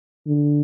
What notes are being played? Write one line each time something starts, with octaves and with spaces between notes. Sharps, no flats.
D3